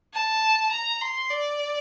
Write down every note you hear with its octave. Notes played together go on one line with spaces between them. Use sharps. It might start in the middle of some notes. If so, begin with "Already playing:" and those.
A5
A#5
C6
D5